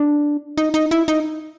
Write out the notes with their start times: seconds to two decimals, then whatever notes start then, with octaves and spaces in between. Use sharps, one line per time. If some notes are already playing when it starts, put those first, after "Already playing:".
Already playing: D4
0.58 D#4
0.74 D#4
0.91 E4
1.08 D#4